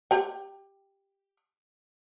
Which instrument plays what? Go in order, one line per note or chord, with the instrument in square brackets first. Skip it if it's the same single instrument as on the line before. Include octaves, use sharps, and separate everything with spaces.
[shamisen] G4 G5